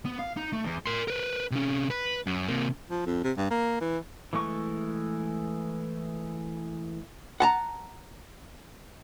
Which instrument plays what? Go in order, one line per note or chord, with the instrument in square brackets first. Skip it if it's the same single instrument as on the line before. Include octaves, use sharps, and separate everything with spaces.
[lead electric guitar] B3
F5
D#4
A3
E2
A#4 C6
A#4 B4
C3 C#4
B4
F#2
C3 A#3
[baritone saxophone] F3
F2
C3
G2
A#3
E3
[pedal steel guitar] E3 G#3 A3 C#6
[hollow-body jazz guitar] F#5 A5 A#5